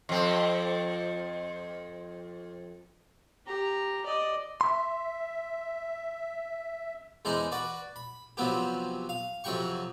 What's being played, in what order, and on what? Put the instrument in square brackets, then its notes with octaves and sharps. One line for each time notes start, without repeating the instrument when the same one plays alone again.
[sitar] F2 C4
[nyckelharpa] G4 A#5
D5 D#5
[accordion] E5 [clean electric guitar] C6
[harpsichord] E2 G#3 D4 D#4 C5 C6
F#4 B4 D5
B5
C3 F3 F#3 B3 C4 G4
F5
F2 C3 F#3 G5 C#6